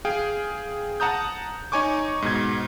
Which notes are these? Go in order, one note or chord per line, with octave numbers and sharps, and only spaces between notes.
G#4 F5 G5
F#5 A5 A#5 D#6 G6
D#4 C#5 G#5 C#6 D6
G#2 B2 G#6